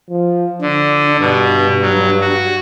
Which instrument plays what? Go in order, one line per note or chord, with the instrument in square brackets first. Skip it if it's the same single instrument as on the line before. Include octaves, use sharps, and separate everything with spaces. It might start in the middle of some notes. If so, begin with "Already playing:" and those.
[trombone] F3
[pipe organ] D3 [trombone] D4
[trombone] G2 [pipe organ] B2
[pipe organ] F#3
F#4